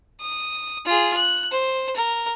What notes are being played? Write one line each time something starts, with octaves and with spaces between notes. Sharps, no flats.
D#6
F4 G#4
F#6
C5
A#4